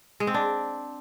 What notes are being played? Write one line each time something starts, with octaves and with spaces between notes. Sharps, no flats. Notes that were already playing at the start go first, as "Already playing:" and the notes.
G#3
C4
D4